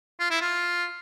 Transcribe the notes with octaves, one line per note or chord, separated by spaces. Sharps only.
F4
E4
F4